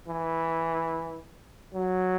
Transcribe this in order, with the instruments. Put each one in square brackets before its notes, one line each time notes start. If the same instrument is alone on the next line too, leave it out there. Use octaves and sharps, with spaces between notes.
[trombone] E3
F#3